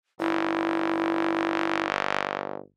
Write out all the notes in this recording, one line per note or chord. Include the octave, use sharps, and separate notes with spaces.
G1 E4